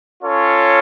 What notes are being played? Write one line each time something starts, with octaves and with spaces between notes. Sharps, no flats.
C#4 F4 A4 C#5